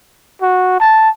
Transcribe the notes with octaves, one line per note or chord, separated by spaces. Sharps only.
F#4
A5